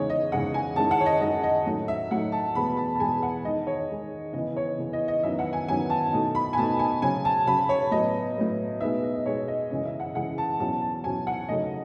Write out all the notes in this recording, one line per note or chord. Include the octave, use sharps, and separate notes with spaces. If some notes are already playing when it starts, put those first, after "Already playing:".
Already playing: E2 C#3 G#3 D#4 C#5
D#5
E2 C#3 G#3 D#4 F#5
G#5
F#2 D#3 G#3 C#4 E4 A5
F#5
C#5
D#5
F#2 D#3 G#3 C#4 E4 D#5
D#5
A2 F#3 A3 D#4
E5
A2 F#3 A3 D#4 F#5
A5
E2 B2 G#3 B3 B5
A5
A5
E2 B2 G#3 B3 G#5
F#5
D#3 G#3 D#4 D#5
C#5
D#3 G#3 D#4
C#3 E3 B3 D#5
C#5
C#3 E3 B3
D#5
D#5
F#2 D#3 F#3 B3 E4 E5
F#5
G#5
F#2 D#3 F#3 B3 E4 G#5
A5
B2 A3 D#4
B5
G#5
B2 A3 D#4 A5
G#5
C#3 F#3 C#4 G#5
A5
C#3 F#3 C#4 B5
C#5
A2 F#3 B3 D#5
A2 F#3 B3
B2 G#3 B3 D#4 E5
D#5
D#5
B2 G#3 B3 D#4 C#5
D#5
F#2 C#3 E3 G#3 D#5
E5
F#5
F#2 C#3 E3 G#3 F#5
A5
E2 B2 F#3 C#4 E4 A5
A5
E2 B2 F#3 C#4 E4 G#5
F#5
F#2 C#3 F#3 A3 D#4 D#5